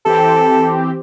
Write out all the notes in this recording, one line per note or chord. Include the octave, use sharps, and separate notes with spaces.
E3 C4 G4 A4